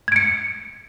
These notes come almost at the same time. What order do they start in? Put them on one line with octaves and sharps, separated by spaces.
G#6 D7 C#7